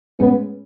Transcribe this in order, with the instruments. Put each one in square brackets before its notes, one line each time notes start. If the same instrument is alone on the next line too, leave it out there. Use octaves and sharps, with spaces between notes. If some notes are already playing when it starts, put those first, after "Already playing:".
[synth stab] A2 G#3 C#4 [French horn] B3